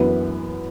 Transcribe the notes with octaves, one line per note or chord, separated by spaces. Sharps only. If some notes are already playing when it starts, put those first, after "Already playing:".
Already playing: F#2 E3 B3